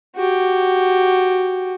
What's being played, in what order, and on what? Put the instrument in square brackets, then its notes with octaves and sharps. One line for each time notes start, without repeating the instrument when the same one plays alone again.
[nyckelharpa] F#4 G4